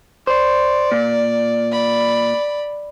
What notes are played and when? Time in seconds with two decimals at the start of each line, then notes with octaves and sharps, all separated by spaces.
0.27 C5 D5
0.92 A#2
1.72 D5 B5